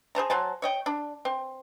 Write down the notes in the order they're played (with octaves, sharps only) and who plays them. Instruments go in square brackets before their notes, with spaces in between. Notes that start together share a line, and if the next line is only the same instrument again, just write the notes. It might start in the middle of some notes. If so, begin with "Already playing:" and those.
[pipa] G#4 C5 A5 A#5
F#3 C5 G#5 A5
C#5 D#5 G5
D4
C4